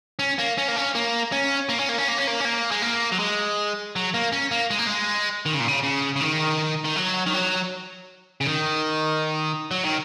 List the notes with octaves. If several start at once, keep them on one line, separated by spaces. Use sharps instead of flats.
C#4
A#3
C#4
A#3
C#4
A#3
C#4
A#3
C#4
A#3
C#4
A#3
C#4
A#3
C#4
A#3
G#3
A#3
F#3
G#3
F#3
A#3
C#4
A#3
G#3
A#3
G#3
D#3
C#3
A#2
C#3
C#3
C#3
D#3
D#3
F#3
D#3
F#3
C#3
D#3
F#3
D#3